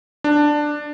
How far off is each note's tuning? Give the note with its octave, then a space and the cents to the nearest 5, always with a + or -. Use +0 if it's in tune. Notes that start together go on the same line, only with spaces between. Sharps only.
D4 +10